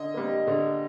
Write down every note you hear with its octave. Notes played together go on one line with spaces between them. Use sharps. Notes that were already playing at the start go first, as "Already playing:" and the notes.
Already playing: D3 D#5
G3 A#3
D3